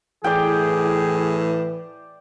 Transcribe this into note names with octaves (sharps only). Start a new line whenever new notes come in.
A2 E3 G#4 D5 G5